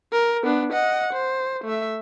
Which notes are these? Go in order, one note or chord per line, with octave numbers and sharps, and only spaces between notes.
A#4
B3 D4
D#5 F#5
C5
A3 E5